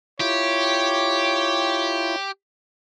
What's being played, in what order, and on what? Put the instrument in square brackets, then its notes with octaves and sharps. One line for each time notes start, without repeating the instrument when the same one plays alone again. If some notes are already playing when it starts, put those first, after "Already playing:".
[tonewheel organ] E4 F4 [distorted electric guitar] G4 [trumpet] C#5